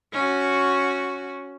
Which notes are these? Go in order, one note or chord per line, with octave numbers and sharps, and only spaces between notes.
C#4 F#4